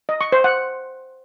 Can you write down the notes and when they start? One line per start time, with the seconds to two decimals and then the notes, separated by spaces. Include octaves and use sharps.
0.09 D#5
0.21 C#6
0.32 C5
0.44 F#5